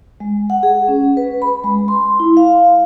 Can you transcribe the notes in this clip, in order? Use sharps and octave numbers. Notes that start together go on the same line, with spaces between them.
G#3
F#5
G#4
C#4
B4
B5
G#3
C6
E4
F5